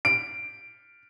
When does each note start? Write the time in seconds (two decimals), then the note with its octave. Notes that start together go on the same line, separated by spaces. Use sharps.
0.05 D7